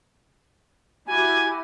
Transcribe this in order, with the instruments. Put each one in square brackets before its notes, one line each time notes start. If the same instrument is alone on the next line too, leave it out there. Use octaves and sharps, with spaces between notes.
[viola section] E4 F#4 G4 [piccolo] G#5